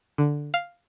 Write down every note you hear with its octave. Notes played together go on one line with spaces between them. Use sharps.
D3
F5